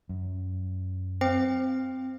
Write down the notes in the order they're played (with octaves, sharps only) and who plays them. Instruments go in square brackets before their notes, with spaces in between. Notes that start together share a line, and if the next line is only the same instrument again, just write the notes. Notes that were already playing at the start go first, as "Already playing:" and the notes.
[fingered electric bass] F#2
[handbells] C4 C5 G5